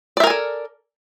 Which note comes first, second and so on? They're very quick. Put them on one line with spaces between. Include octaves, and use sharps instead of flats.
D5 E5 A#4 G#5 A4